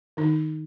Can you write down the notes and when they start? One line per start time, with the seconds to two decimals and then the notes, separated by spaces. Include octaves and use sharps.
0.17 D#3 D#4